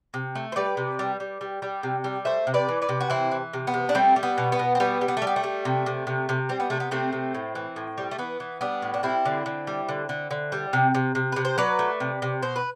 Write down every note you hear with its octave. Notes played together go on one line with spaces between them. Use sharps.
C3
A3
C5
G3 B4 D5
C3
G3
G3
G3
G3
C3
G3
A3 C5 E5
C3
B4 D5
E3
B4 D5
C3
F#4
E3 C4 E4
E3
C3
B3
C3
D4
G3 A3 C4
G3
B3
B2
B3
B2
C4
G3 B3
G3
B3
A3
G3
B3
A3
G3
C3
C3
C3
C3
G3 C4
B3
C3 A3
B3
C3 A3 C4
C3
A2
E3
A2
G3
A3
E3 B3
E3
G3 B3 D4
A2
D4
G3 C4 E4
D3
D3
G3
D3
D3
D3
G3
C3
C3
C3
C3 B4
C5
F#3 B4 D5
A3
C3
C3
B2 C5
B4